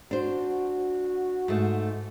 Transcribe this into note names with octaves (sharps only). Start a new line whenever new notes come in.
D4 F#4 C5
G#2 A3